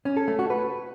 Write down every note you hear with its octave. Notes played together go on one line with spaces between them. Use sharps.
C#4
A4
A3
F#4
B4